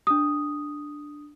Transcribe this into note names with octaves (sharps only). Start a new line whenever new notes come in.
D4 D#6